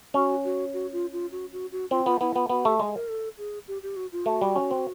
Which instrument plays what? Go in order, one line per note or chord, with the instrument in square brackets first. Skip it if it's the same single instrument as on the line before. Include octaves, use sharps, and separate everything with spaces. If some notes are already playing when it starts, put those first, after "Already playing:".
[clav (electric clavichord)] C#4 [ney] F#4
[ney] F#4
F#4
F4
F4
F#4
F#4
F#4
[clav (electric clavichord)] C4 [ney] F4
[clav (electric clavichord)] B3 [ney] F4
[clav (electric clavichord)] B3 [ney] E4
[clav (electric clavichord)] B3 [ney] F4
[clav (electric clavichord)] B3 [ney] F#4
[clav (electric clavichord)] A3 [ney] G4
[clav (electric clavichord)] G#3 [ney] G#4
[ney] A#4
A4
G#4
G4
G4
F#4
F4
[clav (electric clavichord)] A3 [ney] F#4
[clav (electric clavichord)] G3
C#4
C4